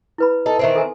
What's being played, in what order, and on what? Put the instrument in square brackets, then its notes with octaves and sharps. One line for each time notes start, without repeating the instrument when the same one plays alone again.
[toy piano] E4 B4 B5
[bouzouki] D#4 A4
D#3 E3 C4
[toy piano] A4 G#5